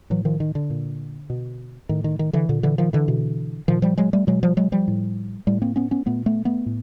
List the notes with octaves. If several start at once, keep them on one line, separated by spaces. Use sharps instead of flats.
A2 E3 F#3
D#3 F3
D#3
D3
A#2
B2
A2 D#3
D#3
D#3
D3 E3
A#2 D3
D3 E3
D#3 F3
D3 E3
B2
A#2 D#3 F3
F3 G3
F#3 G#3
G3 A3
B2 F#3 G#3
F3 G3
F#3 G#3
F3 G3
A2
A2 G3 A3
A#3 C4
B3 C#4
B3 C#4
A#2 A3 B3
A3 B3
A3 B3
A2